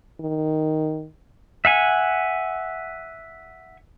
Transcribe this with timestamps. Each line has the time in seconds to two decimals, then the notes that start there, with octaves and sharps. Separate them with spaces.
0.21 D#3
1.65 E5 F#5 G#5